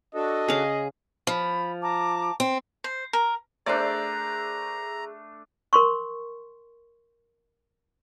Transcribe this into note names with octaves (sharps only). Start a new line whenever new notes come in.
D4 F#4 A4 D#5
C#3 G#4 F5
F3 B5
A5 A#5 D6
C4
C5
A#4
A3 D4 G#4 A#4 C5 D5 A#5 E6
A#4 C6 C#6